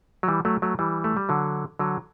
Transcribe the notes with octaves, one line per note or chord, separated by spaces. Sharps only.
F#3
E3 G3
F#3 A3
F#3 A3
E3 G3
A3
G3
D3 F#3
D3 F#3